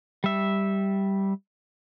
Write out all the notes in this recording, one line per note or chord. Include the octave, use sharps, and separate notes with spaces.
G3 E5